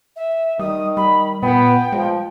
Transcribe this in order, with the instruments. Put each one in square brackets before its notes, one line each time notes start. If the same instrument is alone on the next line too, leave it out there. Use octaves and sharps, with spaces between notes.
[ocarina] E5
[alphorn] D#3 [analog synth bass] G3 [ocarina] D#6
[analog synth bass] G3 [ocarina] B5
[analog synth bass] A#2 [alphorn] B3 [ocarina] G5
[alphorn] F3 [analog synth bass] G#3